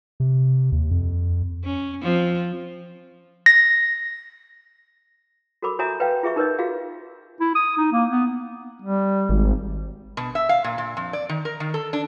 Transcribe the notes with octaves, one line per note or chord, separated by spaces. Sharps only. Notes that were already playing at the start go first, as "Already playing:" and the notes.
C3
D#2
F2
C#4
F3 C4
A#6
F#4 A4 A#4 B5 D6
F#4 C#5 E5 G#5 A#5 D#6
B4 C#5 F5 G5
F4 G#4 E5 C#6
D#4 A#4 B4 C#5 D#5
F4 F#4 G#4 F5
E4
D#6
D#4
A#3
B3
G3
G#1
B2
E5
F5
A#2
A#2
F2
D5
D#3
A#4
D#3
A4
D4